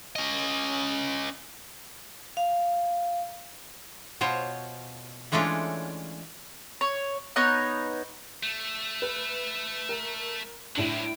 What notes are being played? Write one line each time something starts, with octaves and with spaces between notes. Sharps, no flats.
C#4 D#5
F5
B2 F4 C5 C#5
E3 G#3 A3 C#4 D4 F4
C#5
B3 D#4 C#5 F#6
A3
B4
A#4
A2 C3 F#3 D4 F#7